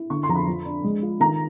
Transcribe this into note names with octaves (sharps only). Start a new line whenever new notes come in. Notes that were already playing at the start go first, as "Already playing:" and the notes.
Already playing: E4
D3 C#6
C6
F2 A#5
B5
F3
D4
G#3
F4
D#3 A#5